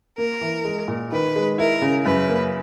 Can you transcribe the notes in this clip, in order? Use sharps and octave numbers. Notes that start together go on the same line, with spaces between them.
A#3 A#4
E3
G#3
A#2
D#3 B4
G#3
E4 A#4
C#3
F#2 B4
A#3